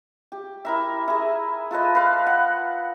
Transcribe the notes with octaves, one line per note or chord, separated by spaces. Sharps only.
G4
E4 A#4 E5
E4 G#4
F4 A4 B4 D#5
B4 F5
F#5